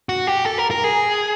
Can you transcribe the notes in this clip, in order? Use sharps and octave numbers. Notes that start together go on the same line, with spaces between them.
F#4
G4
A4
A#4
A#4
G#4